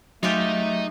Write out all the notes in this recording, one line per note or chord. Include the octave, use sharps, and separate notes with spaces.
F#3 G#3 A3 D#4 F4 G4